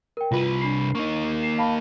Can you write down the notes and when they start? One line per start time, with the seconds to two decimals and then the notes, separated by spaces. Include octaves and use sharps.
0.17 A#4 G5
0.32 C2 F4 B4
0.61 D4 B5 C7
0.95 A#3 D#4 C#6
1.42 C7 E7
1.58 F5 A5 B5